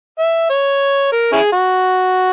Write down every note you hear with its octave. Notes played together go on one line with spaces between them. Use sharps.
E5
C#5
A#4
C#4 E4 G#4
F#4